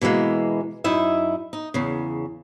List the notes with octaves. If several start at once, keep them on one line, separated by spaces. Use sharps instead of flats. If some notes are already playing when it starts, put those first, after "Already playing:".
B2 E3 G3 G#3 A#3
F#2 D#4 E4 E5
D#4
E2 C#3